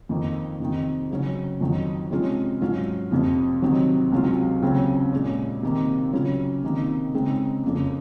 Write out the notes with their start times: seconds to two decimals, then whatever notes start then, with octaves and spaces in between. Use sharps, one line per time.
0.09 F2 D#3 A#3
0.60 F2 C3 D#3
1.11 C#3 F#3 C#4
1.61 F2 D#3 F#3
2.11 C3 F3 G#3 C#4 F4
2.62 G#2 F#3 C#4 F4
3.11 F2 C3 F3
3.62 C3 D#3 F#3
4.12 C#2 C3 F#3 C#4 F4
4.62 D#2 C#3 F#3 C4
5.13 A#2 G#3 C#4
5.63 C3 D#3 A#3
6.13 C#3 F#3 C#4 F4
6.63 C3 D#3 A#3 D#4
7.14 C#3 G#3 C4 D#4
7.63 F2 C#3 F3 A#3